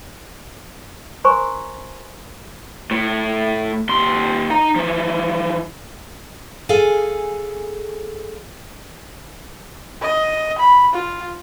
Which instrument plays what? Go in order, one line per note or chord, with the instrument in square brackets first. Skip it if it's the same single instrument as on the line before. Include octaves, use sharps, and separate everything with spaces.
[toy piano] A#4 C5 G#5 A#5 C6 C#6
[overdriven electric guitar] A2
D#2 C6
D#4 A#5
E3 F3
[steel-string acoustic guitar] G#4 A4 F5 G#5
[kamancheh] D#5
B5
F4